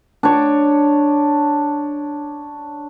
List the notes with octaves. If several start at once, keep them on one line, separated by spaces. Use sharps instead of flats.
D4 C#5